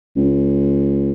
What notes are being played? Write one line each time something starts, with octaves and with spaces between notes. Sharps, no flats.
C#2